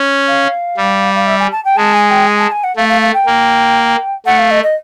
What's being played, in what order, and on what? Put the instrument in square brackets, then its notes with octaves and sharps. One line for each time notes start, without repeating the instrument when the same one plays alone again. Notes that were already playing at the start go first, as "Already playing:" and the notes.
Already playing: [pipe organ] C#4
[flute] F5
[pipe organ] G3
[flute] F5
E5
G#5
A5
G5
[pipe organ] G#3 [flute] A5
[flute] G#5
G5
G#5
A5
G#5
F#5
[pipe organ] A3 [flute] F5
[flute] F5
F5
G5
[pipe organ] A#3
[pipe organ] A3 [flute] F#5
[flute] F5
D#5
D#5